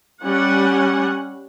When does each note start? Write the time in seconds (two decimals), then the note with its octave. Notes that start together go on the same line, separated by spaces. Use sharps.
0.23 G3 C#4 F#5